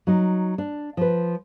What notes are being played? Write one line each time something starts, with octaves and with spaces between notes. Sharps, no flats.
F#3 D#4
D4
F3 B4